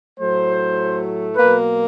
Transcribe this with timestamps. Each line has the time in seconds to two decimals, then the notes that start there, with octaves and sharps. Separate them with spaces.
0.19 A2 F#3 A3 C5
1.36 B2 F#3 A#3 B4